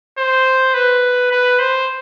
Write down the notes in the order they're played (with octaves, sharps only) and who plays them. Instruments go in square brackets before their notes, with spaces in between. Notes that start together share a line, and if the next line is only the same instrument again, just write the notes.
[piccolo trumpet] C5
B4
B4
C5